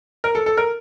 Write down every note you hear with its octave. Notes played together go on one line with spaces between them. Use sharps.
A#4
A4
A4
A#4